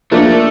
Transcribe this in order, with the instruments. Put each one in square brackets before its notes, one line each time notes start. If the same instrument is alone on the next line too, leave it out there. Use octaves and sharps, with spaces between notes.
[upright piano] F3 A#3 D4 [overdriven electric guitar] A3